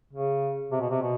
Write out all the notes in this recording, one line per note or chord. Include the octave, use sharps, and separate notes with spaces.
C#3
C3
B2
C3
B2